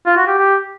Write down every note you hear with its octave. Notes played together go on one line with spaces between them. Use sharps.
F4
F#4
G4
G4